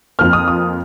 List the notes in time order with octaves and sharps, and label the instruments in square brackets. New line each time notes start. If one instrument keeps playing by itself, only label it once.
[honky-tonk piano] F2 F3 A#3 F6
D#6
D#6